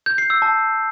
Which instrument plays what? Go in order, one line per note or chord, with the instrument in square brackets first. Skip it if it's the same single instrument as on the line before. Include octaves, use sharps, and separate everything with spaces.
[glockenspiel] G6
C7
E6
A5